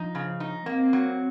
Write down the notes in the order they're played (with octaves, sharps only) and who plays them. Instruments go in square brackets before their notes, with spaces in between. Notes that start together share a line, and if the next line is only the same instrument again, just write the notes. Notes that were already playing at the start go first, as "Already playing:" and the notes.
Already playing: [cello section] F3 [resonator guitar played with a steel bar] D#4
[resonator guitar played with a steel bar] C#3
D#4
[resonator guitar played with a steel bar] A#3 [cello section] C4
[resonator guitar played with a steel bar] F#3